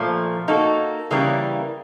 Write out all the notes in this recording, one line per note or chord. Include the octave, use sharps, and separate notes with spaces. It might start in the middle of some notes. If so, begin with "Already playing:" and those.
Already playing: A#2 F3 A3
A#3 D#4 F#4 A4
C#3 E3 G3 A#3